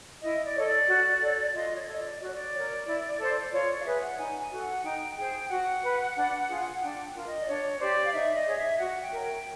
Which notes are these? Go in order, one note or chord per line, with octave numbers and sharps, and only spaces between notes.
E4 D#5
D5
A4 C#5 D#5
D5
F#4
A4 C#5
F4 D#5
C#5
A4 C#5 D#5
D5
F#4 D5
C#5
D5
A#4 C#5
E4
A4 C5
F4 C#5
D5
F5
G#4 B4 E5
F#5
D#4 G#5
G#5
F#4 A4
F#5
D#4 G5
G#4 C5 G5
F#4 F#5
B4
D4
F4 G#4
D4 G5
F4 A#4
D#5
D5
D4 C#5
G4 C5 D5
F5
D#4 E5
D#5
G#4 C#5
E5
F#4 F#5
G5
A#4 C#5
G5